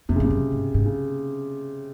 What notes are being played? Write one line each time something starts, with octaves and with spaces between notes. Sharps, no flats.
F2 C3
C#3
G2 C3
F#2
G#2
G#2
C#3